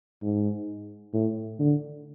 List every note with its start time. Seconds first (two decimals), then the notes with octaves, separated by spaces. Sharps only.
0.23 G#2
1.14 A2
1.59 D3